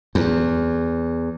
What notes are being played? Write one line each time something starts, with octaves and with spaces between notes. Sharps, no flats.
E2